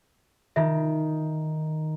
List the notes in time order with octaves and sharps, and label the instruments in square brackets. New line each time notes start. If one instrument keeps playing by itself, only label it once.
[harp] D#3 [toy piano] D#4 F4 E5